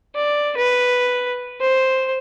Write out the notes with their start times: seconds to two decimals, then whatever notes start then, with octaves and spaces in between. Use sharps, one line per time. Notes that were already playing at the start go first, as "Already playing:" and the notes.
0.15 D5
0.57 B4
1.61 C5